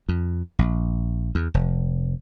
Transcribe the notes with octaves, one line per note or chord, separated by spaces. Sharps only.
F2
A#1
E2
F1